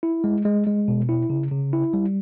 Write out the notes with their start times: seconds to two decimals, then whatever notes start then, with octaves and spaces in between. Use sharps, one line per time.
0.03 E4
0.24 G#3
0.45 G#3
0.67 G#3
0.88 B2
1.09 E4
1.30 C#3
1.51 C#3
1.73 E4
1.94 G3